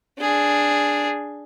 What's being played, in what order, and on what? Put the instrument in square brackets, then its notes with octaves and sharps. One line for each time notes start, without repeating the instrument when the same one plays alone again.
[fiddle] D4 G#4